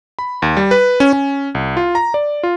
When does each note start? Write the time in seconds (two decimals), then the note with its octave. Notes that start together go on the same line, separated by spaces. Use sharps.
0.19 B5
0.42 D#2
0.57 G3
0.71 B4
1.00 C#4
1.13 C#4
1.55 C2
1.77 F4
1.95 A#5
2.14 D5
2.43 F4